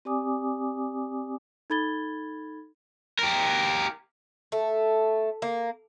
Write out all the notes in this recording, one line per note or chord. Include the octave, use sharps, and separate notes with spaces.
C4 G4 D5 G#5 D6 D#6
D#4 A4 B5 G#6 A6 G7
G4 A#4
A3
A#3